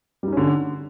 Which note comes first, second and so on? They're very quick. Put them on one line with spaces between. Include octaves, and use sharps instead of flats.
G3 D#4 C#4 D3